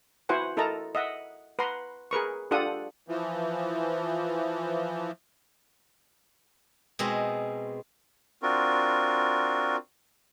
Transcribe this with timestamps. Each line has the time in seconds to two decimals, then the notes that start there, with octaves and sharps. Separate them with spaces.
0.29 E4 F#4 B4 C5 F#5 G#5
0.57 E4 A4 A#4 D#5 A5 A#5
0.95 D#5 E5 F#5
1.59 B4 F#5 A#5 C6
2.11 G#4 A#4 B4 C#6
2.51 D4 F4 G4 A4 F#5 D#6
3.08 E3 F3
6.99 B2 G#3 C4
8.43 C4 D4 F4 F#4 A#4